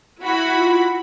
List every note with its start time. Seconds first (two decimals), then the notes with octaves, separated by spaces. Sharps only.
0.23 E4 F#4 B5
0.57 F4